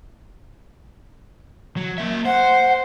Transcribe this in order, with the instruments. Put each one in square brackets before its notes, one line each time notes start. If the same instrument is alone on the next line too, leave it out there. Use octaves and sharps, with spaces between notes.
[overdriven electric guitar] F#3
A#3 E5
[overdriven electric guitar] C5 [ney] F#5